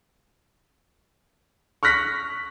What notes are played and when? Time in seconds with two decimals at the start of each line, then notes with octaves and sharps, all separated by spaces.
1.83 C#6 F6 F#6 A#6 B6